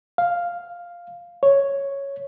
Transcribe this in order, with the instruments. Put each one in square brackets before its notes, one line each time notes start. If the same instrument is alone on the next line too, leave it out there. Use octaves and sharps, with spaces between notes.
[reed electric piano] F5
C#5